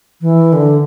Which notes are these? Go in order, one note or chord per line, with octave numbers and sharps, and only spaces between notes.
E3
D3